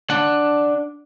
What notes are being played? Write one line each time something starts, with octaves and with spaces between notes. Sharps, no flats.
D4 F#5